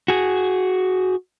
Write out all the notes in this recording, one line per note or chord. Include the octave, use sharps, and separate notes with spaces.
F#4 G#4